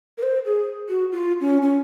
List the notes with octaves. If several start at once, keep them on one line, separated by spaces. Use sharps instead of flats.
A#4
C5
G#4
F#4
F4
C#4
C#4